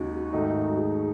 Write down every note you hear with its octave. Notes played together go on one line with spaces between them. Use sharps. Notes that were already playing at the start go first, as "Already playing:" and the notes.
Already playing: D#2 C#3 G#3 D#4 F#4
G#2 D#3 A3 D#4
G#4